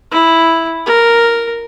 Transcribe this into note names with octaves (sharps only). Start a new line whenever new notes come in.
E4
A#4